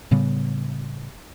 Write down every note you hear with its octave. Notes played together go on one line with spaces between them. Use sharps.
A2 C#3 G3 B3